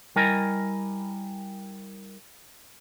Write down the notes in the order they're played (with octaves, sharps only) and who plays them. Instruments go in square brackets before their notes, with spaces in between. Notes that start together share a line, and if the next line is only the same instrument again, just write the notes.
[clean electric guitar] G3 E4 A#4 D#5 G#5 A#5